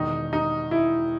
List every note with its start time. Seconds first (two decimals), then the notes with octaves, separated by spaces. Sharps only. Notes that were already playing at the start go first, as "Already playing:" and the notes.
Already playing: E1 E2 D#3 D#4
0.33 D#4
0.71 E4